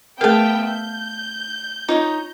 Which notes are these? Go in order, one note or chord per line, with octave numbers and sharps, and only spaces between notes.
A3 B3 G#4 A#4 E5 F5 G5 A5
G6
D#4 F4 C#5 D#5